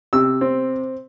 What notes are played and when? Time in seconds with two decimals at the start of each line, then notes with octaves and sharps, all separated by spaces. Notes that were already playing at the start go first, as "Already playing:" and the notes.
0.13 C3 E6
0.41 C4